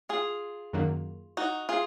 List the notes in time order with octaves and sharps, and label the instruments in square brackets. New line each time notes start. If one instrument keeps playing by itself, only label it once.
[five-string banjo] F4 G#4
[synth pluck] F#2 D#3 F#3 A#3
[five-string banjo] D#4 F#4
F4 G#4